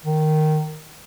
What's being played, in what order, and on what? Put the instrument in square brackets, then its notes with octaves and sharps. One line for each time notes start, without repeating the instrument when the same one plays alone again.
[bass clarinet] D#3